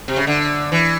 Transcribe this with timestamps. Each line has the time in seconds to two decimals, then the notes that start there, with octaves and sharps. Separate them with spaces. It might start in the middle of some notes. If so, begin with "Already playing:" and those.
0.08 C3
0.17 C#3
0.27 D3
0.72 E3